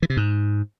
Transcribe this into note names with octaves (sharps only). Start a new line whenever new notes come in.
E3
C3
G#2